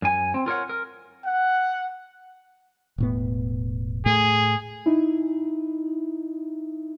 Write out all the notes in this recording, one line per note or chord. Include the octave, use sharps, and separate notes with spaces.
F#2 G#5
C4
F4 A#4 C#5 F#5
A#4
F#5
E1 A2 B3
A2 A3 G#4
D#4 E4